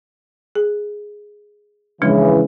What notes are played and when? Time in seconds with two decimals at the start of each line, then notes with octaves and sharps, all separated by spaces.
0.55 G#4
2.02 C#3 E3 F3 G#3 D4